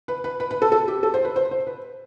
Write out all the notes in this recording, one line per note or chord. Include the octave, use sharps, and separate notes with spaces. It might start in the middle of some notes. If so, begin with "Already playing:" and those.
B4
B4
B4
B4
A4
A4
G4
A4
C5
B4
C5
C5
B4